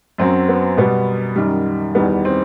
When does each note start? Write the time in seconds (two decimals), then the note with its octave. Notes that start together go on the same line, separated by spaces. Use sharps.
0.18 F#2 F#3 C4
0.49 B3
0.77 B2 G3 B3
1.36 F#2 D#3 G3
1.95 E2 D#3 G3 B3
2.25 C4